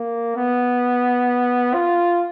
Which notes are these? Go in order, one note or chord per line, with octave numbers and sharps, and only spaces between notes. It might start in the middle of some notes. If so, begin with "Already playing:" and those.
Already playing: A#3
B3
F4